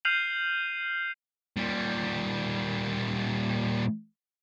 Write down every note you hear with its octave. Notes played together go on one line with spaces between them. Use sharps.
F6 G6 C7 D#7 F7 F#7
A#2 G3